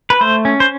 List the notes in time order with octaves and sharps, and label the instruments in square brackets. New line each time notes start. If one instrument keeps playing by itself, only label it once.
[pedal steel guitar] B4
A3 C5
C#4
C5